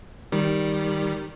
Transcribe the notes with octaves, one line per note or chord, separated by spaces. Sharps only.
D#3 G3